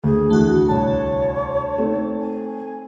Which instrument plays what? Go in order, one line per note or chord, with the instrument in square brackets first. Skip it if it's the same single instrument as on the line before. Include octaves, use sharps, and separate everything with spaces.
[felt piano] D2 [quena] G#4
[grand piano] E2 A2 D3 [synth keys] A3 F#4
[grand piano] C2 D3 [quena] C#5 [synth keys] A5
[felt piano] A3 D#4 [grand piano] C4
[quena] G#5